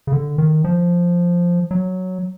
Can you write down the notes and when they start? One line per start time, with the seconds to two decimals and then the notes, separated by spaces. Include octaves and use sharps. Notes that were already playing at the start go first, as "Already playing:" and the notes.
0.07 C#3
0.13 D3
0.38 D#3
0.64 F3
1.71 F#3